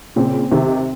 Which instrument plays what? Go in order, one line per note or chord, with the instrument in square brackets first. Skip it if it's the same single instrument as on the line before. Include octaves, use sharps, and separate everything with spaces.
[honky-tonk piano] A#2 C#3 [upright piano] C4
[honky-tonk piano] C3 D#3 [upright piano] C4